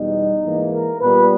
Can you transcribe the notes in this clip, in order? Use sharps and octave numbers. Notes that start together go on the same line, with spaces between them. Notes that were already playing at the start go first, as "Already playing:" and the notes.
Already playing: E2 B2 G3 D#4
G#2 E3 A#3
A#4
A#2 G3 B3 B4